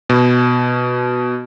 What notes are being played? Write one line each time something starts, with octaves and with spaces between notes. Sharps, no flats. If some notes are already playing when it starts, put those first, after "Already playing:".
B2